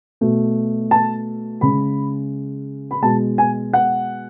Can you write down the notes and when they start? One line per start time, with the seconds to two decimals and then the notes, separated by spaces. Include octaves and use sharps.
0.21 B2 A3
0.91 A5
1.61 C#3 G#3 B5
2.91 B5
3.02 B2 G#3 A5
3.38 G#5
3.73 F#5